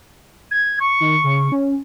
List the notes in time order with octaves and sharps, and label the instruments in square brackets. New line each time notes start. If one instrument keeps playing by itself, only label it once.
[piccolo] G#6
C#6
[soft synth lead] D#3
C#3
C#4